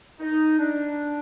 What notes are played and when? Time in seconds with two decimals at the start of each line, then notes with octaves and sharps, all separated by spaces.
0.20 D#4
0.59 D4